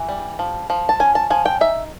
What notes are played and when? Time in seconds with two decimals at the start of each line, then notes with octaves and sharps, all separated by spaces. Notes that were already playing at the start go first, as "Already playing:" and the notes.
Already playing: E3
0.09 G3
0.39 F3
0.70 F3
0.89 A5
1.00 C#4 G#5
1.15 A5
1.30 F3 G#5
1.46 G5
1.61 D#4 E5